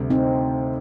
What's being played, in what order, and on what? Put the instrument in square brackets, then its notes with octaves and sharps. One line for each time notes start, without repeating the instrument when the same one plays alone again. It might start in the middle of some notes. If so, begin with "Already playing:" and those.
Already playing: [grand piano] D2 C3 G3
[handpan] C4 D#4